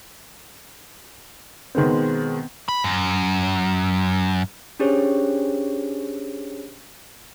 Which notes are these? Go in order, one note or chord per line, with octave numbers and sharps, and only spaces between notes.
B2 D#3 G#3 B3 C4
B5
F#2
C#4 D4 G4 G#4 C5 C#5